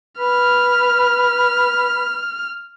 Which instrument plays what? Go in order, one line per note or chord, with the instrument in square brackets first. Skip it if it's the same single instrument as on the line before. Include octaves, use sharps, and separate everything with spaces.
[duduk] B4 [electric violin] F6